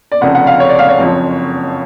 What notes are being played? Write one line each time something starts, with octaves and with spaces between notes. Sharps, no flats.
D5
F1 F2 C#3 F#5
F#5
F5
C#5
D5
F5
C#5
F#1 F2 F3